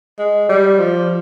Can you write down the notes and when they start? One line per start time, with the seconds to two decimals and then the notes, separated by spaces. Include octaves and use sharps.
0.19 G#3
0.49 G3
0.79 F3